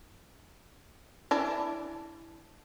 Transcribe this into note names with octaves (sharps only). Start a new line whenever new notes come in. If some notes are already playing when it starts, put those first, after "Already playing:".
E3 D4